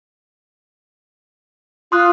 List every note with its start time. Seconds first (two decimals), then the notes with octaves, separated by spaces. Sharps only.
1.92 F4 C6 D#6 F#6